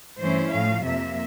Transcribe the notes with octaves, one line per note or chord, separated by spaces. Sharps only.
G2 E3 A3 C#4 E4 C5
A2 F3 A3 F5
F2 C3 F3 A#3 E5